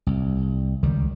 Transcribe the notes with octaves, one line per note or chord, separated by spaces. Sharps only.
C2
C#2 D#3 G3